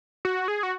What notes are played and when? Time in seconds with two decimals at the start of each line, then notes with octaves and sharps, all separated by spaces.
0.25 F#4
0.48 G#4
0.63 F#4